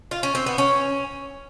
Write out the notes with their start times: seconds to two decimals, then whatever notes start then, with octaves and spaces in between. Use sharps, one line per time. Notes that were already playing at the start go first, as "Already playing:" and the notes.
0.11 F4
0.23 C#4
0.35 C4
0.46 B3
0.58 C#4